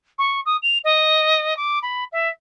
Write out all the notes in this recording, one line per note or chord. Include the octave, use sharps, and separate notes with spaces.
C#6
D#6
F7
D#5
D6
B5
E5